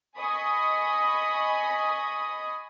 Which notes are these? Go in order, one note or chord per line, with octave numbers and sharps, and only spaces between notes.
D#5 G#5 B5 C#6 D#6